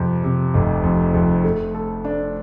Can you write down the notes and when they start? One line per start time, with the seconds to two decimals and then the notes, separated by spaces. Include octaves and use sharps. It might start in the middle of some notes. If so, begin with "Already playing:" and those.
Already playing: F2 C3
0.24 C3
0.54 F1
0.83 F2
1.14 F2
1.44 A3
1.75 A4
2.05 D4